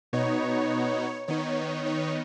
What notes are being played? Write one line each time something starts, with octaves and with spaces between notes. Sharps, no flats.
B2 B3 D#4 C#5
D#3 B3 D#4 C#5
C#5